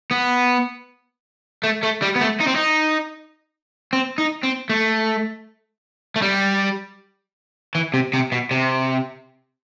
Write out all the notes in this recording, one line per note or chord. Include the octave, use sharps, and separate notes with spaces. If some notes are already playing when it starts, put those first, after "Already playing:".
B3
A3
A3
G3
B3
A3
D#4
C4
D#4
C4
D#4
C4
A3
A3
G3
E3
C3
C3
B2
C3